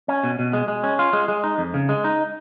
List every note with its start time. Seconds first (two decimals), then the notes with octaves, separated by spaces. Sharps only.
0.08 C#4
0.24 B2
0.39 B2
0.53 G#3
0.68 G#3
0.84 C#4
0.99 F4
1.13 G#3
1.28 G#3
1.44 D#4
1.58 F2
1.74 C#3
1.89 G#3
2.04 D#4